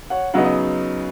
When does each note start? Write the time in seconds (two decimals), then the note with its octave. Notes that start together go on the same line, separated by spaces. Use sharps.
0.10 C#5 F#5
0.34 C#3 F#3 B3 D#4 F#5
0.44 D#5